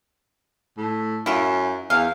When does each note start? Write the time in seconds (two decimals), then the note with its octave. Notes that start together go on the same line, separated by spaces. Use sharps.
0.77 A2
1.26 F#2 E4 F4
1.90 E2 F5